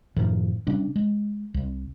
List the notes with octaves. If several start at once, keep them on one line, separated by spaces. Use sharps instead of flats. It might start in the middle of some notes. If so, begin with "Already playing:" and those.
F#2 A2 D#3 F3
C3 G3 C#4 D4
G#3
C2